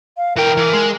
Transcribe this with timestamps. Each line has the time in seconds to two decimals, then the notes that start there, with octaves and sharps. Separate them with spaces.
0.17 F5
0.37 E3 A#4 G5
0.57 E3
0.73 G#3